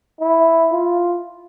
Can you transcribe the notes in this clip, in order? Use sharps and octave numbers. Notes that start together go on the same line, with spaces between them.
E4
F4